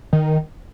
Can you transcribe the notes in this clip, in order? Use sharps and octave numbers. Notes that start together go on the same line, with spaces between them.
D#3